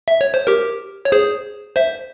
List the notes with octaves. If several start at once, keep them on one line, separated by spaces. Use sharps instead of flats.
E5
C#5
C5
G4 A#4
C#5
G#4 C5
C5 E5